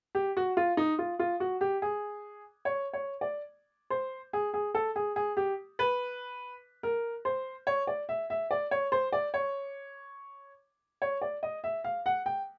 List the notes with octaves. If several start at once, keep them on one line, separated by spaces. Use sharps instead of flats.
G4
F#4
F4
D#4
F4
F4
F#4
G4
G#4
C#5
C#5
D5
C5
G#4
G#4
A4
G#4
G#4
G4
B4
A#4
C5
C#5
D5
E5
E5
D5
C#5
C5
D5
C#5
C#5
D5
D#5
E5
F5
F#5
G5